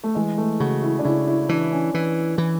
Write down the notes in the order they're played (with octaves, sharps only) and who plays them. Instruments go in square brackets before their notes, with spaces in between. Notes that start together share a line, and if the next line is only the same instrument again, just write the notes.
[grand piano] A3
[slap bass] E3 [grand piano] G#3
[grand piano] A3
[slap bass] C#3 [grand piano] F#4
[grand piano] E4
D4
[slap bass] C#3 [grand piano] E4
[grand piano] E4
[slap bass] E3 [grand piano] D4
[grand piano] C#4
[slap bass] E3
E3